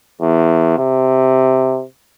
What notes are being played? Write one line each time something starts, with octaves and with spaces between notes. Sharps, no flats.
E2
C3